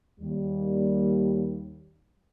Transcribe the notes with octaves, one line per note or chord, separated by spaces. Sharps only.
D#2 G3